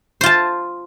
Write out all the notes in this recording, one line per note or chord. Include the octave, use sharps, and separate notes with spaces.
F4 C5 A5